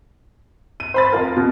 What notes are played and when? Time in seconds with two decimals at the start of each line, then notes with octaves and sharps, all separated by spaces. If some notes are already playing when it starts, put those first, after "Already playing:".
0.80 D#7
0.94 C5 B5 A6
1.12 F2 F4 A#4
1.37 B2